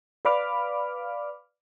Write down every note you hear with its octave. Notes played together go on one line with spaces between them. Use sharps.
B4 D5 F5 B5 D6 F6